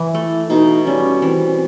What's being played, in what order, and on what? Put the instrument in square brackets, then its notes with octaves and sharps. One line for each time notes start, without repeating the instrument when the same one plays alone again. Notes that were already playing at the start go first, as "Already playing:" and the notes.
Already playing: [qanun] E3 [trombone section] E4
[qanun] A3
[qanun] B2 [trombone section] D#4
[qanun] G3 [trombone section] C#4
[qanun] E3 [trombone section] C4